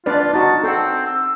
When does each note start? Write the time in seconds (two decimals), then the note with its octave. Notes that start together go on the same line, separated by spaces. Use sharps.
0.06 D4 F4 B4 D5
0.33 D#4 F#4 A5
0.64 C4 A4 F#5
1.06 E6